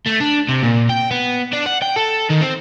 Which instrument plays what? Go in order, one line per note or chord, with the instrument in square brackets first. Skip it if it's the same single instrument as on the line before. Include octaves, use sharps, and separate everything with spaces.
[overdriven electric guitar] A3
D4
C3
A#2
G5
B3
D4
F#5
G5
A4
D#3
C4